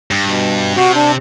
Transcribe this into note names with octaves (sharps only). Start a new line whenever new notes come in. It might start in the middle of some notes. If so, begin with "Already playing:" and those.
G2
B2
C3 F#4
D4